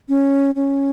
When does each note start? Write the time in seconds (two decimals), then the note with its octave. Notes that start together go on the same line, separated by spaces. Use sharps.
0.09 C#4
0.56 C#4